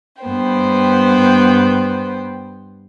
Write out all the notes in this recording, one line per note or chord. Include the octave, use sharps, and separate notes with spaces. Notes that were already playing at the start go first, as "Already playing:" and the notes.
G2 B3 C5 G5